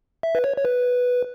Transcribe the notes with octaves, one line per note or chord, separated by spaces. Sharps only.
E5
B4
C#5
C#5
B4